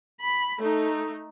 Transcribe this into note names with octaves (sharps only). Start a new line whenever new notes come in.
B5
A3 D#4